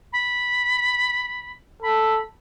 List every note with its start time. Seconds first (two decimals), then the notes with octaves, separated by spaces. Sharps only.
0.13 B5
1.82 A4 B5